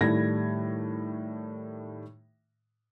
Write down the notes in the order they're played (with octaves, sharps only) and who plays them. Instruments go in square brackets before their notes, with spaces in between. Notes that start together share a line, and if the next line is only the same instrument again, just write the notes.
[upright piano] A2 D#3 G3 A3 G#6 A#6